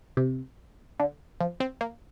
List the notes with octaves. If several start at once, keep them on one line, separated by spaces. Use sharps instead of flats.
C3
D3
F3
C4
A#3